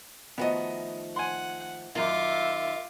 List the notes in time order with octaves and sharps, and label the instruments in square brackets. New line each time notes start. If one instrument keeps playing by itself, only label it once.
[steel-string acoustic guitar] D#3 F3 A3 [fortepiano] B3 F#4 D#5
[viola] F#5 [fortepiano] G#5 C6
[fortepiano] F#2 A#4 F5 [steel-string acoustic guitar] D#3 [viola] F4 D6 [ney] E5